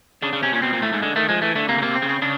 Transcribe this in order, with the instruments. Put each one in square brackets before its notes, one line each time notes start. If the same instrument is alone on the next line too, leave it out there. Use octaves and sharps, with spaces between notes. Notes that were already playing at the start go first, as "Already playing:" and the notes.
[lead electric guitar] C#3 [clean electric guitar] D4
[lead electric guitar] C#3
[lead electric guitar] C3 [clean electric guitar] C#4
[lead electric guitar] A#2
[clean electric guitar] C#4
[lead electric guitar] B2 [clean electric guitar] C4
[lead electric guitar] A#2
[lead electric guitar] A2 [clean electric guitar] A3
[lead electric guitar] G#2
[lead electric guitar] D3 [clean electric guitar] G#3
[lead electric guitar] D#3 [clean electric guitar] A3
[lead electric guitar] F3 [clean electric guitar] G#3
[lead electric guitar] E3 [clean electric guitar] A3
[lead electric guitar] D3 [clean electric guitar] A3
[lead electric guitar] C3 [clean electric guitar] A#3
[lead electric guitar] C#3
[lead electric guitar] C3 [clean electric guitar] A#3
[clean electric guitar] C4
[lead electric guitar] C#3
[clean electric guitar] C4
[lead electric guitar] C#3 [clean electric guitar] D4